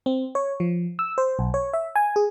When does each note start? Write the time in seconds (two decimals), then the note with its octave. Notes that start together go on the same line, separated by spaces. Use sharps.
0.06 C4
0.35 C#5
0.60 F3
0.99 E6
1.18 C5
1.39 B1
1.54 C#5
1.73 E5
1.96 G#5
2.16 G#4